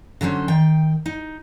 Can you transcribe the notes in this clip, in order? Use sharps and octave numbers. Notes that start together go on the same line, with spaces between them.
D3 F#3 C#4 C5
D#3 G5
D#4